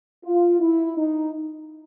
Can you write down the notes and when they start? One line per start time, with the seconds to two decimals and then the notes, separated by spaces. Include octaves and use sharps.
0.25 F4
0.60 E4
0.97 D#4